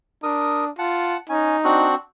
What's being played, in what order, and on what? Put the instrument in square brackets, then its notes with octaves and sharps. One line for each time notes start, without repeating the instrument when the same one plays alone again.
[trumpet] D4 [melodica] A#4 D#6
[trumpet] F4 [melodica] F#5 A5
[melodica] C#4 G#5 [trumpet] D#4
[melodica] C4 D4 F#4